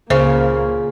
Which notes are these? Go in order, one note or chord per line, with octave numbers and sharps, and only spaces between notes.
C#2 A#2 C#3 A#3 C5